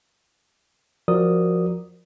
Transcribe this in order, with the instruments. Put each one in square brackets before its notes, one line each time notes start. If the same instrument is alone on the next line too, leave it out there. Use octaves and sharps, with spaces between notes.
[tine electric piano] F3 F#4 A#4 D5 D#6